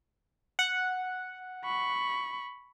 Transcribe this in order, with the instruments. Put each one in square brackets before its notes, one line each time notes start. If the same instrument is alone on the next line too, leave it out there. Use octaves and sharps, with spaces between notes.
[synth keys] F#5
[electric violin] B5 C#6